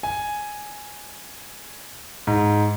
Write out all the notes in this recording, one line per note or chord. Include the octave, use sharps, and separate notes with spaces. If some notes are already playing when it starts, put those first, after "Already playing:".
G#5
G#2